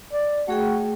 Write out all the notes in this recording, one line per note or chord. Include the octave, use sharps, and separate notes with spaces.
D5
A3 F#4 G#4 G5